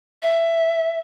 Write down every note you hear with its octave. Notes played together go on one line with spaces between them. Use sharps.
E5